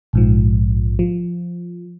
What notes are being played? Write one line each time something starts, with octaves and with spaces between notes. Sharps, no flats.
A#1 G#2 F3
F3